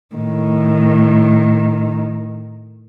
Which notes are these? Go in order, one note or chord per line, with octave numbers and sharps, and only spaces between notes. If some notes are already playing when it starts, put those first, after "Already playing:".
A2 D#3